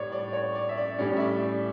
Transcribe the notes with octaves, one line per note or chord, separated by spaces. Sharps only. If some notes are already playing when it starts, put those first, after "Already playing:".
Already playing: A2 G3 C#5 D5
D5
C#5
D5
E5
D5
A2 G3 C#4 D5
E5
D5